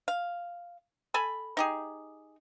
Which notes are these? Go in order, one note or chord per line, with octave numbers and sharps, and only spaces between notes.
F5
A4 G#5 B5
D#4 G4 G#4